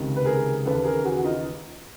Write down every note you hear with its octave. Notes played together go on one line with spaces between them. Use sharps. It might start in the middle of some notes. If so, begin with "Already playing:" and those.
Already playing: C#2 C3 D#3
B4
G#4 A#4
D#2 C#3 E3 A4 B4
G#4 A#4
F#4 G#4
F#4
D#4 F4